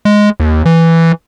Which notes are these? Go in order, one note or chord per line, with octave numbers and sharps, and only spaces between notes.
G#3
D#2
E3